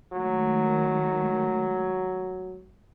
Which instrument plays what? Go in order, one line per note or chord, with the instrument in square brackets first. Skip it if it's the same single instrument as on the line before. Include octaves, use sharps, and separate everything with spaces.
[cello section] D#3 G#3 A3 [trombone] F#3